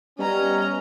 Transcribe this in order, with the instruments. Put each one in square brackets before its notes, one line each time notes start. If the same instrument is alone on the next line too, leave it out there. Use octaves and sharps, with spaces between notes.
[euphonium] G3 [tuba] B3 [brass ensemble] C#4 [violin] D#5 A#5